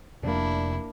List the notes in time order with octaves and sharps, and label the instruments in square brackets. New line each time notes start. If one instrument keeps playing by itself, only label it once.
[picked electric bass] F1 F2 C3 [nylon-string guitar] A#3 D5 [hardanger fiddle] D4 E4